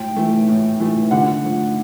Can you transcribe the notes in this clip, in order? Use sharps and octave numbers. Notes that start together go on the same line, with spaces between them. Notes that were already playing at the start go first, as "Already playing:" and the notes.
Already playing: A2 G5
E3 A3
A2
E3 A3
D3 F#5
F3 A3